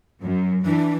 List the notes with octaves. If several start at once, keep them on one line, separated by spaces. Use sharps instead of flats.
F#2
E3 D4